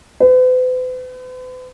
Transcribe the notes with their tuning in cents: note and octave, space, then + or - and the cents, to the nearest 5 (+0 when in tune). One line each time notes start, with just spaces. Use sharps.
B4 +45